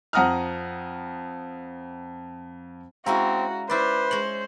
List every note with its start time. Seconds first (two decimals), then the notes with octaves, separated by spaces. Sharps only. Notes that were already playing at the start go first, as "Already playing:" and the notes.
0.13 F2 F#5 A#5 D#6 F6
3.06 G#3 C4 C#4 E4 F#4 F5 A#5
3.70 C#4 E4 B4 C5 D5 D6
4.11 G#3 C#5 F#7